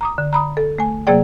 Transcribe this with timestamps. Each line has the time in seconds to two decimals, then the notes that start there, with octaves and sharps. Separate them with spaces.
0.01 A#5 D6 D#6
0.18 D3
0.33 A#5 B5 D#6
0.57 A4
0.78 A3 G#5
1.07 C3 F#3 A#3 G#4 D5 G5